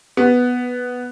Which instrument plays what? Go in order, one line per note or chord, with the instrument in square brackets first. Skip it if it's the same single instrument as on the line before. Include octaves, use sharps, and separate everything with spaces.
[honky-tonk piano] B3